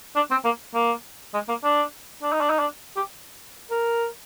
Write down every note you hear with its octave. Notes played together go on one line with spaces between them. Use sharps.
D4
C4
A#3
A#3
G#3
A#3
D4
D4
D#4
D4
D#4
D4
G4
A#4